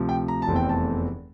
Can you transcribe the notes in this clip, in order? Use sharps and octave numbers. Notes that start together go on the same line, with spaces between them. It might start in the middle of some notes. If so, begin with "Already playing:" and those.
Already playing: D2 C3 F3
G5
A#5
A5
F1 E2 E3 A3 C4
G5
A5